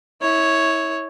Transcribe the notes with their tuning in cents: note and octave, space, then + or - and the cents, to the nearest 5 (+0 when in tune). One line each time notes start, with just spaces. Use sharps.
E4 -25 C#5 +0